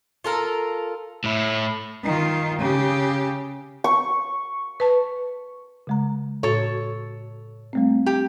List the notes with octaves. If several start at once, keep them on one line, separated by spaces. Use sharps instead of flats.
F4 A4 A#4
A2 E4
D#3 F4
C#3 G4
C#6
B4 A5
C#3 G#3 A#5
A2 F#4 A4 C#5
G3 A3 C4
G4